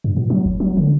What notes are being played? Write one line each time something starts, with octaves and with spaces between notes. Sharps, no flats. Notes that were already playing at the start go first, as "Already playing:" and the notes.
G2
A#2
F#3
F#1
F#3
D3